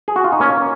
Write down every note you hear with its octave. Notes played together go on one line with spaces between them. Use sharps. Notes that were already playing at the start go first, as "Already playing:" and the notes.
G#4
F#4
F4
D#4
A#3 C#4